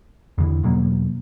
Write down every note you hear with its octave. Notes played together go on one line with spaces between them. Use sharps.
E2 D3 E3
E2 B2 F#3 A#3